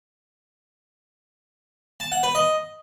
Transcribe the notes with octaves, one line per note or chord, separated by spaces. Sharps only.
A5
F#5
B4
D#5